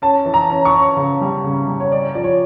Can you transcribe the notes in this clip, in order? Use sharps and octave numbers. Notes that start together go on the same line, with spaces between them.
C#4 A5
E3
A#5
C#4
C#6
C#4
C#3
G3
C#3
G3
C#5
C#4 D5
F3 D5
C#5